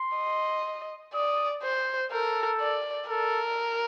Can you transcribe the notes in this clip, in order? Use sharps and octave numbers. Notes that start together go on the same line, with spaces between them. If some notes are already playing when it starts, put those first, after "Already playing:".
Already playing: C6
D#5
D5 D#6
C5
A4 A#4
D5
A4 A#4